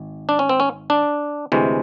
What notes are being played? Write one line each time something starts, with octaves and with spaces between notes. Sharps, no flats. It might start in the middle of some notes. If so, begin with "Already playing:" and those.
Already playing: G#1
D4
C#4
C4
C#4
D4
D2 C3 E3 G#3